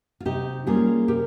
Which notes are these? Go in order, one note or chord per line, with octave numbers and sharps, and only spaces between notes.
F4
C3 D#4 G4
G3 A#3 C#4 F4 G#4
C3 G4 A#4